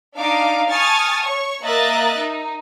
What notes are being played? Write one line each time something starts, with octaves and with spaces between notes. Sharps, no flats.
D4 D#4 F5 D6
G#5 A5 C#6 D#6 F6 A6
C#5 C#6
A#3 A#4 D#5 E5 F#6 A6
D#4